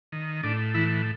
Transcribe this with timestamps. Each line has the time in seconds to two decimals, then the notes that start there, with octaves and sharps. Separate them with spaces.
0.12 D#3
0.43 A2 D4
0.74 E3 E4